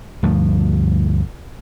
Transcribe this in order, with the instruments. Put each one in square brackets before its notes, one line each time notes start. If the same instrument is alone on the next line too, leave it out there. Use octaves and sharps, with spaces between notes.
[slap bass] D2 G2 F3 A3